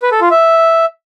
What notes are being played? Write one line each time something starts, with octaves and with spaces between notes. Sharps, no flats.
B4
A4
F4
E5